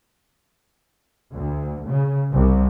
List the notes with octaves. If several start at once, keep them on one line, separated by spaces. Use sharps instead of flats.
D2
C#3
C2